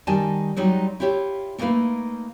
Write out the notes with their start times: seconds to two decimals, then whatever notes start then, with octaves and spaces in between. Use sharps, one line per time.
0.07 D#3 G3 D#4 G#5 A5
0.56 F#3 G3 D#4 F4 F#4
1.00 E4 F4 G4 C#5 E5
1.58 A3 A#3 D#4 E4 B4 F5